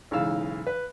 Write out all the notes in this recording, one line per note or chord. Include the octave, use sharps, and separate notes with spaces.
B1 G#2 C#3 E3 F5 E6
B4